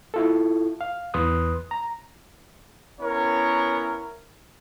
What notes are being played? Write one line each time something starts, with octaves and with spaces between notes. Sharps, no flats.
E4 F4 A4
F5
E2 B4 C6 D#6 F#6
A#5
B3 C#4 E4 A#4 C#5